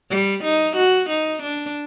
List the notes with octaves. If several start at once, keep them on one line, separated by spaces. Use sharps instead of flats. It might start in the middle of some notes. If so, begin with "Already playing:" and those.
G3
D#4
F#4
D#4
D4